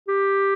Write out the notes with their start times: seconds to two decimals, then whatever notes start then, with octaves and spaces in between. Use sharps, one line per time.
0.08 G4